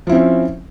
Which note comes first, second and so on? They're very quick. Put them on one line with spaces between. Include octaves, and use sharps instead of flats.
F3 E4 C4 C#4